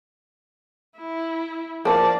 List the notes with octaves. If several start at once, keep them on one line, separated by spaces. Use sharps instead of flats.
E4
F3 A#3 D4 D5 A5